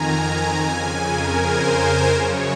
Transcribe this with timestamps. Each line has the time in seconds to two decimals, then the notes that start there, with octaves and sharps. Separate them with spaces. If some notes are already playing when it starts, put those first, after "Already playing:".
Already playing: F2 D#3 G#5 A#5
0.66 F2 C#3 G#5
1.03 A#4
1.39 C5
2.11 F#2 C#3 C#5